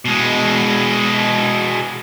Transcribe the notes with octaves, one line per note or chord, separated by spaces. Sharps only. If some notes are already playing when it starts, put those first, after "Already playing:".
B2 G#3